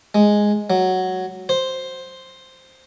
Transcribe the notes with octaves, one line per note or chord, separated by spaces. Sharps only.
G#3
F#3
C5